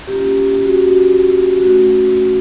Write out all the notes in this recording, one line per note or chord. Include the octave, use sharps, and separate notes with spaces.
A#3 C#4 F4 G4
G4
G4
F#4
F#4
A3 C#4 F#4
F#4